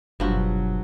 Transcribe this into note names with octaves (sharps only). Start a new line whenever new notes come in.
F#1 G2 B2 F3 F#3 F#4